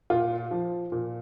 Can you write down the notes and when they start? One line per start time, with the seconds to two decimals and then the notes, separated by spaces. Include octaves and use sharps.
0.10 A#2 F4
0.51 F3
0.92 A#2